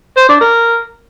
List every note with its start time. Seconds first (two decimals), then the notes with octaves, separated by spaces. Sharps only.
0.17 C5
0.29 D4
0.41 A#4